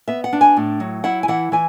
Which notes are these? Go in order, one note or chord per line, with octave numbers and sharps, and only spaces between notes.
B3 E5
F#5
D4
G#5
A2
F#3
E4 F#5
G#5
E3 F#5
E3 G#5